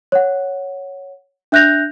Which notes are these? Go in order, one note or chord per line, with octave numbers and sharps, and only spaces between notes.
C#5 F#5
D4 E5 F#6 G6 A#6 F7